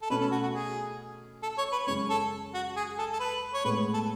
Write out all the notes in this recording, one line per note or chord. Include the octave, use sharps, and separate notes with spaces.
A4
B2 A3 C#4 B4
A4
F#4
F#4
G#4
A4
C#5
B4
F#2 C#3 G#3 C#4 C#5
A4
F#4
G#4
A4
A4
B4
C#5
A2 G#3 B3 B4
A4